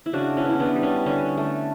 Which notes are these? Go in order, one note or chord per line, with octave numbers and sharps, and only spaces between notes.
E4
C#3 D4 F#4
C#4 E4
B3
E4
B3 D4
G3
C#4
D3 C#4
A3